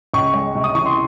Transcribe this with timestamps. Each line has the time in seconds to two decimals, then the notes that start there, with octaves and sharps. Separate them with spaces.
0.14 C#2 C#6
0.34 G#3
0.55 C3
0.64 D#6
0.75 E3 C#6
0.86 C6